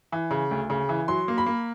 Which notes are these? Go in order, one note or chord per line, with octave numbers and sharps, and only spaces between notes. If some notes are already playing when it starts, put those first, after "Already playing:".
E3
C#3
D2
C#3
E3
F#3 C6
A#3
B5
A#3